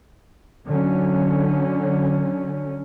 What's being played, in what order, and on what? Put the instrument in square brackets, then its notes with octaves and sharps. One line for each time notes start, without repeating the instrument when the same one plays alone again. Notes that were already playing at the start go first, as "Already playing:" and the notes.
[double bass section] D3 F#3 C#4